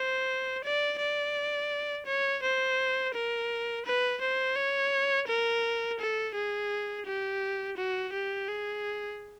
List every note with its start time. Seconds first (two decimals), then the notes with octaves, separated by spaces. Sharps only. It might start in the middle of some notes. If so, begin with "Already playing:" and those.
Already playing: C5
0.65 D5
0.99 D5
2.06 C#5
2.43 C5
3.14 A#4
3.85 B4
4.21 C5
4.56 C#5
5.28 A#4
5.99 A4
6.35 G#4
7.06 G4
7.77 F#4
8.13 G4
8.48 G#4